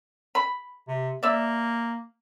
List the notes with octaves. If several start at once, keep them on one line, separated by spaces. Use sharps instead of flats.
B5
C3
A#3 D5 E5